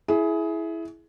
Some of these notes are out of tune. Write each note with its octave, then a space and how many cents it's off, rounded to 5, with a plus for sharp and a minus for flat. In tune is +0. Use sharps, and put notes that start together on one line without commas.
E4 +0 G#4 +20